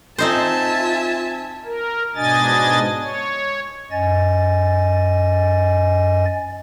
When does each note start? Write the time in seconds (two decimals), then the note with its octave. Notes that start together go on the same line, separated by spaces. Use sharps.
0.18 C4 D#4 F4 C5 E5 G#5 A5
1.65 A#4
2.16 G#2 B2 D4 D#5 G#5 A6
3.03 C#5
3.91 F#2 D#5 G#5 A6